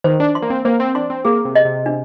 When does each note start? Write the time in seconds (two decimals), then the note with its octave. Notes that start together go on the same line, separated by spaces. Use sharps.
0.04 D#3 C5
0.20 D4
0.35 C6
0.42 A#3
0.50 C4
0.65 A#3 C5
0.80 C4
0.95 D4 C6
1.10 C4
1.25 A#3 G#4
1.45 C3
1.55 D#5
1.65 C3
1.86 D4